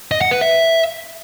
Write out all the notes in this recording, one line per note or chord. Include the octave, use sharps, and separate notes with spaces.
D#5
F#5
B4
E5